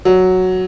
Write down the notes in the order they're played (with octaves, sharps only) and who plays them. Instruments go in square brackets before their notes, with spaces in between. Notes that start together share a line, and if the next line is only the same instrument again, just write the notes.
[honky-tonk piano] F#3